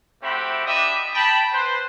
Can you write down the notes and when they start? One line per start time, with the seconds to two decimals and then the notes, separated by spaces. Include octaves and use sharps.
0.22 A3 C4 F#4 G4 E5 B5
0.66 D4 G4 D#5 E5 B5 D#6
1.14 G5 A5 B5
1.52 B4 C5